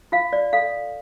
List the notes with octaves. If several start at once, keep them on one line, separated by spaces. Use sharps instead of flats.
F4 F5
D5
A4 F5